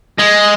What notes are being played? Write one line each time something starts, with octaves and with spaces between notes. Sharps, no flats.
G#3